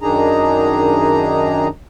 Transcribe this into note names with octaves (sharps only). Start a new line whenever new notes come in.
F#2 D#3 D4 D#4 G#4 A#5